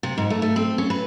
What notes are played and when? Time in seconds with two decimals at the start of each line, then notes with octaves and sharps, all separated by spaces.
0.03 C3
0.18 G#2
0.30 A3
0.42 A3
0.56 C4
0.78 C#4
0.90 B4